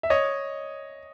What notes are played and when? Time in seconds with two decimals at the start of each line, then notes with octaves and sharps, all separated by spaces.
0.03 E5
0.10 C#5 D#5